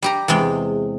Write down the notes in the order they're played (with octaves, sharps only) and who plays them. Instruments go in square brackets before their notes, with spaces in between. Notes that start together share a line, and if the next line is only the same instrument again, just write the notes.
[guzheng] G3 G4 A#5
E2 C3 G#3 G5